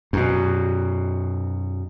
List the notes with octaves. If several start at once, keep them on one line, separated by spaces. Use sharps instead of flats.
F#2 B2